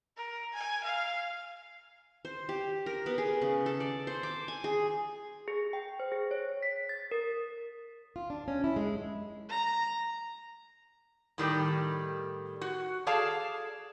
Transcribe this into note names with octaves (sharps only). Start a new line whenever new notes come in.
A#4
G#5
F5
C5
G4
A#4
B3
G#4
C#3
A4
D5
C5
D6
G#5
G#4
G#4
G5
C5
G#4
C#5
B6
A6
A#4
F4
D4
C#4
E4
G#3
F#2
A#5
A2 D#3 G3 G4
F#4
G#4 A4 D5 F5 A5